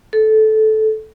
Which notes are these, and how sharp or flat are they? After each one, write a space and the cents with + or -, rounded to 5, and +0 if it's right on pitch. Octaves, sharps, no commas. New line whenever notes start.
A4 -15